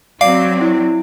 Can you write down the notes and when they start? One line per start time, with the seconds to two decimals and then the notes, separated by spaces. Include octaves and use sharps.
0.21 F#3 C4 D5 F5
0.61 E4